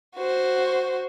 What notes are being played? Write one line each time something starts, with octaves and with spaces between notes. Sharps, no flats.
F#4 C5